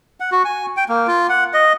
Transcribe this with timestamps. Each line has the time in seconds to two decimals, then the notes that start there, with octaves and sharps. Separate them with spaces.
0.20 F#5
0.32 F#4
0.45 G#5
0.77 G5
0.89 A#3
1.07 F4
1.29 F#5
1.54 D#5